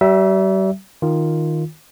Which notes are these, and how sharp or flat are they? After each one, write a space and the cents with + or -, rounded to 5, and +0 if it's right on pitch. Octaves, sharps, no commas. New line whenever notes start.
G3 -40 E5 +0
D#3 +0 F4 +0